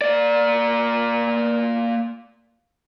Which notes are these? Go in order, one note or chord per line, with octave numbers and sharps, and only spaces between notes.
A#3 D5